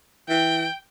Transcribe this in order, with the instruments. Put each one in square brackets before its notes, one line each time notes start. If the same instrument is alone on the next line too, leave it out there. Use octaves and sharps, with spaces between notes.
[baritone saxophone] E3 [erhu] G5